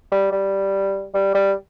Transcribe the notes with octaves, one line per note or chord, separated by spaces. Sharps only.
G3
G3
G3
G3